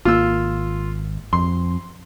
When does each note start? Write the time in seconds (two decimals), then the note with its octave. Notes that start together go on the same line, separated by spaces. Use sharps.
0.05 G#1 A#3 F4 E6
1.33 F2 C6